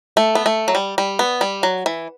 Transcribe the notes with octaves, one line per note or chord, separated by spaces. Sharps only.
A3
B3
A3
F#3
G3
G3
B3
G3
F#3
E3